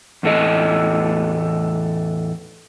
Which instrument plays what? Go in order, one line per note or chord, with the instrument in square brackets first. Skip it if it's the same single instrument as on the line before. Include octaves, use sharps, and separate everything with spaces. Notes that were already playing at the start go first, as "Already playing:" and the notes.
[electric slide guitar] E2 A2 A3 D#5